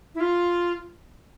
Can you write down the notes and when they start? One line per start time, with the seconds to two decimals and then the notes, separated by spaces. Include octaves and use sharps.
0.15 E4
0.20 F4